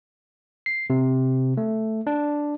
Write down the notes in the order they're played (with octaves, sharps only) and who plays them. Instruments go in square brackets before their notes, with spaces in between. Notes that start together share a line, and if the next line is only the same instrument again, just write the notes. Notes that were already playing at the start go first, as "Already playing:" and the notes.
[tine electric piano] C7
C3
A3
D4